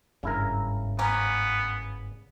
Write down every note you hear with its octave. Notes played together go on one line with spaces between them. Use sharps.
G1 G#2 C#3 E4 A#4
A#3 B3 C#4